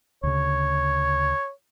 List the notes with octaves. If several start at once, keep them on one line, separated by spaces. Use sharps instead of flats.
D2 C#3 C#5